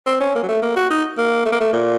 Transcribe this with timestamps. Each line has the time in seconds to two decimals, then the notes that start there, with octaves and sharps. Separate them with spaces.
0.07 C4
0.20 C#4
0.35 A#3
0.43 F#3
0.49 A3
0.62 A#3
0.76 F#4
0.91 D#4
1.18 A#3
1.46 A3
1.52 A#3
1.61 A3
1.73 A#2